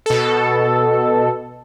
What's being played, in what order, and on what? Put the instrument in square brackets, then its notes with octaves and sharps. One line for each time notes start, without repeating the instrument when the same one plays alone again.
[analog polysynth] B2 A4